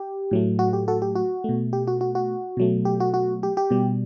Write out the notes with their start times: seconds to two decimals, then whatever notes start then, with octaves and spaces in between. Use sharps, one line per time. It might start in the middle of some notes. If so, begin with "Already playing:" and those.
Already playing: G4
0.31 A2 F#3 A3
0.59 F#4
0.73 G4
0.88 F#4 A4
1.02 G4
1.15 F#4
1.44 B2 A3
1.73 G4
1.87 F#4
2.01 F#4
2.15 F#4
2.57 B2 F#3 A3
2.85 G4
3.00 F#4
3.14 F#4
3.43 G4
3.57 G4
3.70 B2 G3